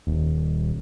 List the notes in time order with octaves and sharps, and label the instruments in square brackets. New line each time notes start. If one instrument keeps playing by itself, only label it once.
[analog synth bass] D#1